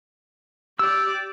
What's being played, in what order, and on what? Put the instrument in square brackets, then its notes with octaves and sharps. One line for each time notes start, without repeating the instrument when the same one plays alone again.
[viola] G4 D5 [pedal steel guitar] E6